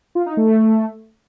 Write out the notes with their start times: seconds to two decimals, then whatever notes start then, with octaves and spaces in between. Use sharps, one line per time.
0.15 F4
0.26 D#4
0.37 A3